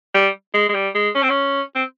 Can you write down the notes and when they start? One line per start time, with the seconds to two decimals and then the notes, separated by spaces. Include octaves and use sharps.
0.15 G3
0.54 G#3
0.69 G#3
0.74 G3
0.95 G#3
1.15 C#4
1.23 C4
1.29 C#4
1.76 C4